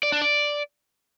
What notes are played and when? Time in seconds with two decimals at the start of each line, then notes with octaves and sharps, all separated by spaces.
0.03 D5
0.12 D4
0.22 D5